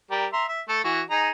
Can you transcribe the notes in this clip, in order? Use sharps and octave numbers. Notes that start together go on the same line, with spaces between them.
G3 G4 A#4
E5 A#5 C6
E5
A3 A4
E3 F#4
D#4 G#4 A#5